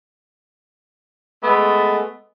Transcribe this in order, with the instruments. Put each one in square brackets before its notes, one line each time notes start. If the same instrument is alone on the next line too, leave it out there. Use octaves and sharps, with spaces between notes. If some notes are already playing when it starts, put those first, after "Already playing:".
[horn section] G#3 A3 B3